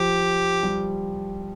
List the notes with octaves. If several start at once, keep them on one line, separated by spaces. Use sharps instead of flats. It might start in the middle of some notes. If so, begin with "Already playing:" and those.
Already playing: F3 G4
G3